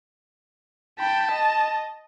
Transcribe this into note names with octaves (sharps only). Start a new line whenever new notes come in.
G5 A5 B5
D#5